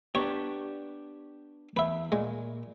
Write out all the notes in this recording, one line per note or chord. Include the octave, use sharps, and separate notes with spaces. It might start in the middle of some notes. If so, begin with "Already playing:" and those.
B3 D4 G4 C#5
E2 B4 E5
A#2 G#3